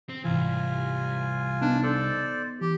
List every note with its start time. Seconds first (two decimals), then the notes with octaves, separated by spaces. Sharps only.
0.09 C4
0.24 C2 G#2 E3 F4 G#5
1.61 B3 D4 D#4
1.83 A4 C5 D5
2.61 E3 G4